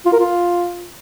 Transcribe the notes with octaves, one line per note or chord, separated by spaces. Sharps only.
F4
A#4
F4